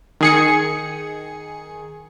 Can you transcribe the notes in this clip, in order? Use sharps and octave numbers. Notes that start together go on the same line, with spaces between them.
D#3 G#4 C#7